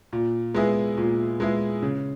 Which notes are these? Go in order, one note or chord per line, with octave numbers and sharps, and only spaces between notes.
A#2
G#3 B3 E4 G#4
A#2
G#3 B3 E4 G#4
C#3